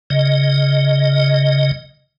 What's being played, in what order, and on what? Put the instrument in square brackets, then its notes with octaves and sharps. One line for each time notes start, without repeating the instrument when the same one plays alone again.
[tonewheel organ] C#3 D#5